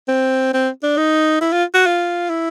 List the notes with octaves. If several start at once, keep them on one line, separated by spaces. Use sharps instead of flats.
C4
C4
D4
D#4
E4
F4
F#4
F4
E4